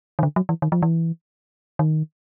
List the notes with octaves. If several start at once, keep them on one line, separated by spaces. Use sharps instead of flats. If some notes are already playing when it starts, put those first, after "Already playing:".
D#3
D3
F#3
E3
D#3
F3
E3
D#3